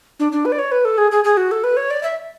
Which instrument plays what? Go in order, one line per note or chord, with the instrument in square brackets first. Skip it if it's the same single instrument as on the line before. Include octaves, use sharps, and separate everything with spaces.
[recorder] D4
D4
B4
D5
C#5
B4
A4
G#4
G#4
G#4
F#4
A4
B4
C#5
D5
E5